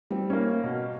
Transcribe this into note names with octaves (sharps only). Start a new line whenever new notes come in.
G3 C4
A#3 C#4
B2